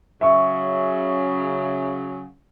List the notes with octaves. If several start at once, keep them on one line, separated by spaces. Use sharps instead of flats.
C#3 F#3 E5 C#6